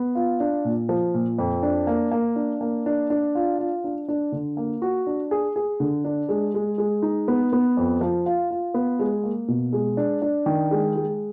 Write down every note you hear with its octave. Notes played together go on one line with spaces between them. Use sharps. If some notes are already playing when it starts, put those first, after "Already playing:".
Already playing: B3
F4
D4
A#2
F3
A#2
F2
D4
A#3
A#3
D4
A#3
D4
D4
F4
F4
D4
D4
D3
A#3
F#4
D4
G#4
G#4
D3
D4
G#3
G#3
G#3
D#4
B3
B3
F2
F3
F4
F4
B3
G#3
A#3
B2
G#3
D4
D4
D#3
G#3
G#3